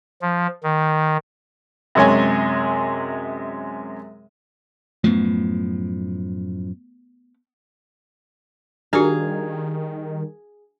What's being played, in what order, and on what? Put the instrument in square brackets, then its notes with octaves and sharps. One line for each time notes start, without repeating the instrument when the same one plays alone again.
[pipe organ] F3
D#3
[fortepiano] F#2 C3 G#3 C#5 G#5
[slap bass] F#2 A2 F3 [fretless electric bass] A3 B3
[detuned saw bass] D#3 [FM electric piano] G3 A#4 [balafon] D4 F#4 [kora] G#4 F5